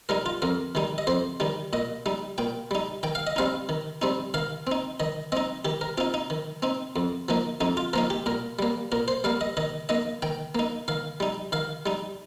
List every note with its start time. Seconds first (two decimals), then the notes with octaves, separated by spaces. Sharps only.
0.09 G3 D#4 A#4
0.26 F4
0.42 F2 A#4
0.75 D#3 G3 D#4
0.98 D#5
1.07 F2 C5
1.40 D#3 G3 D#4
1.73 A#2 D#5
2.06 G3 D#4
2.38 A#2 G5
2.71 G3 D#4
3.03 D#3 G5
3.15 F5
3.27 D#5
3.36 G3 C4 D#4 F5
3.69 D#3
4.02 G3 C4 D#4
4.34 D#3 F5
4.67 C4 D#4
5.00 D#3 D#5
5.32 C4 D#4 D#5
5.65 D#3 G4
5.81 A#4
5.98 C4 D#4 F4
6.14 D#4
6.30 D#3
6.62 C4 D#4
6.96 F2
7.28 F3 A#3 D#4
7.61 F2 D#4
7.77 F4
7.93 F3 A#3 D#4 A#4
8.10 G4
8.26 A#2 A#4
8.59 G3 A#3
8.92 A#2 A#4
9.08 C5
9.24 G3 A#3 F5
9.41 D#5
9.57 D#3 D#5
9.89 A#3 D#4 D#5
10.22 D#3 G5
10.55 A#3 D#4
10.88 D#3 F5
11.20 G3 D#4
11.52 D#3 F5
11.86 G3 D#4